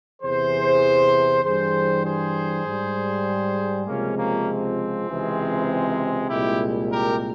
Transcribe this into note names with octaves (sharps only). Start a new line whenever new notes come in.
E2 C3 E3 G#4 C5
G2 E3 G3 G#4 C5
G#4 C5
G#2 G3
C#2 C3 F3 G#3 A#3 C#4
A#3 C#4
C4
C#2 C3 E3 G#3
C2 A#2 G#3 E4 G4
G4 A#4